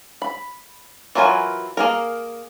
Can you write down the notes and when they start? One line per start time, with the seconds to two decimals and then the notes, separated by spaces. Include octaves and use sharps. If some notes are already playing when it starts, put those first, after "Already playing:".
0.22 B5
1.15 E3 F#3 F4 A#4 G#5
1.77 A#3 G#4 A#4